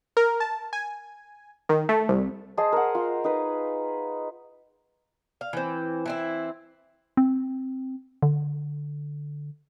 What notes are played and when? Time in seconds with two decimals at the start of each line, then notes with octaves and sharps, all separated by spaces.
0.17 A#4
0.40 A5
0.73 G#5
1.69 D#3
1.89 A3
2.09 C2
2.57 G#4 C5 D#5 A5
2.72 A#4 F#5
2.95 F4
3.24 D#4 B4
5.41 F5
5.53 E3 C4
6.06 E3 C4 E4
7.17 C4
8.22 D3